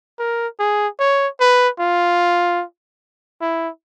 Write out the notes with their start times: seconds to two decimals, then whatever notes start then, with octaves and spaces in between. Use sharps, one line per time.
0.19 A#4
0.59 G#4
1.00 C#5
1.40 B4
1.79 F4
3.41 E4